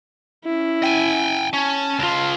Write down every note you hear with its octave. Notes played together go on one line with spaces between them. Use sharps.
C#4 E4
G5 G#5
C#4 A5
C#2 F4